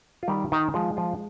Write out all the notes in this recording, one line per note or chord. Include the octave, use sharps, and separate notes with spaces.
F4
D#3 G3 G4
D#3 D#4
F3 G#3 F4
F3 F4